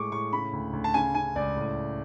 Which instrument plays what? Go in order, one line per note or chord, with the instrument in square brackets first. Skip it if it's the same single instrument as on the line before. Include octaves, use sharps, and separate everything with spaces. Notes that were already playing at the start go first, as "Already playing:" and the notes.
Already playing: [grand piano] A2 G#3 C#6 D6
A2 C#6
C#3 B5
D2
D2
A5
C#3 G#5
C#3 G#5
C#2 D5
A2